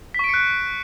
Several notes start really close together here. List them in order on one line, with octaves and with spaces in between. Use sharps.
B6 C#6 D7 C#7 F#6